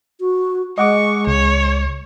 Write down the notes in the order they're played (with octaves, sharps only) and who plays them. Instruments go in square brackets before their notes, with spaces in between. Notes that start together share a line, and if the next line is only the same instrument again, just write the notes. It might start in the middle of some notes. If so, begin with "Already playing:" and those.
[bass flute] F#4
[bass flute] G#3 [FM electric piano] D#5 F#5 D6 [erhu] C#6
[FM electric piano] C#2 [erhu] C#5